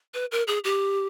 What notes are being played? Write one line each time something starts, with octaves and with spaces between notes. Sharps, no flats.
B4
A#4
G#4
G4